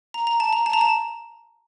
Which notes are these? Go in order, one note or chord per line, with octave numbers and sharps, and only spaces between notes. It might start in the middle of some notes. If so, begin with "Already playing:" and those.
A#5
A#5
A5
A#5
A5
A#5
A5